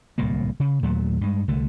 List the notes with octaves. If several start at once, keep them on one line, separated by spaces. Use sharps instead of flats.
D1 C2 A#2 A#3
C#3
D#2 A#2 F#3 A3
G2 G#3
C2 D3 A3